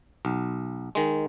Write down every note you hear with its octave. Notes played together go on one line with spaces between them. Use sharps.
B1
D#3 G#3